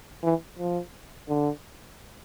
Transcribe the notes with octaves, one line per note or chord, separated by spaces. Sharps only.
E3
F3
D3